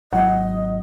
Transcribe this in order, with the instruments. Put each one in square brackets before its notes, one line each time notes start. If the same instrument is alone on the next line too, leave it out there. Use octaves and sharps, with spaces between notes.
[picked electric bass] G#1 F#3 [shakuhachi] D#5 [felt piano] F#5